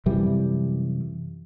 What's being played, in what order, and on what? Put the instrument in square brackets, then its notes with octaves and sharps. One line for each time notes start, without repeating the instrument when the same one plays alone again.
[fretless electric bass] F#2 C3 E3 G3